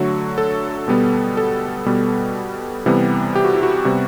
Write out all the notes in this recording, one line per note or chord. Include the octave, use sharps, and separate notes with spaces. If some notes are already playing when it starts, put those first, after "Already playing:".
Already playing: D3 F#3 A3 F#4
A4
B2 G3 B3
A4
B2 G3 B3
C3 E3 G3 B3
G4
F#4
E4
F#4
C3 G3 B3